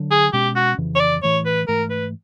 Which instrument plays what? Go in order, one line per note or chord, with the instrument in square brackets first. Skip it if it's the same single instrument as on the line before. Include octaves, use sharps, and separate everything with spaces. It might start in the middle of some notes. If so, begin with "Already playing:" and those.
Already playing: [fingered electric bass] D3 F#3 D4
[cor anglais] G#4
[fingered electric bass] B2 G#3 C#4 [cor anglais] G4
[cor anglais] F#4
[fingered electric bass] F2 C#3 E3
[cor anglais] C#5
D5
[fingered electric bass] A2 E3 A3 [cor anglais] C#5
[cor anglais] B4
[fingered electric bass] G#2 E3 A3 [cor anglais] A#4
[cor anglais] B4